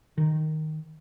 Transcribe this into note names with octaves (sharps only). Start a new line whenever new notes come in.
D#3